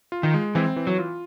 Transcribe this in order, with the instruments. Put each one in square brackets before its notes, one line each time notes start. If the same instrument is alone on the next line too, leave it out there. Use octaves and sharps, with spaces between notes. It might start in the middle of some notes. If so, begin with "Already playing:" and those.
[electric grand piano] F4
[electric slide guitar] D#3
[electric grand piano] G#3
[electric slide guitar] E3 [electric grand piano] C4
[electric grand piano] E3
[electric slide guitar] F#3
[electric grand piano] F4